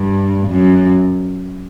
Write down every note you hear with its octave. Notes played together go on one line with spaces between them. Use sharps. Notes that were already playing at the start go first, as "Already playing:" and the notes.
Already playing: G2
F#2